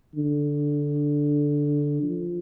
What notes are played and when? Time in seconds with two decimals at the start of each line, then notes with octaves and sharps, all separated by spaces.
0.15 D3
2.03 F3